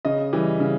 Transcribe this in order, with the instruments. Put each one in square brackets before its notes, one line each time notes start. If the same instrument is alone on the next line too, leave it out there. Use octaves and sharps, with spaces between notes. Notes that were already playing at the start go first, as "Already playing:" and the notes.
[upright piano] C#3 D#5
E3 G3
C#3